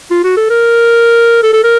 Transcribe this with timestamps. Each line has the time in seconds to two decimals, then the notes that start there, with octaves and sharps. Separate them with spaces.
0.11 F4
0.24 F#4
0.37 A4
0.50 A#4
1.43 A4
1.53 A4
1.64 A#4